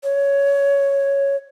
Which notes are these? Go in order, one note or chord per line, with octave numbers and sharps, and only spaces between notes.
C#5